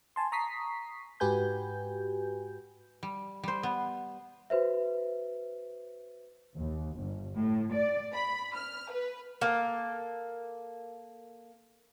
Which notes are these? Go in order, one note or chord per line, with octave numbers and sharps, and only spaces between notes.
G#5 A5 C6
A#5 C#6 D#6 B6 C7
G#2 F#4 G4 B4 G#5 G6
G3
G3 C5
B3
F#4 B4 C5 E5
D#2
G1
A2
D5
B5
F6
B4
A#3 A4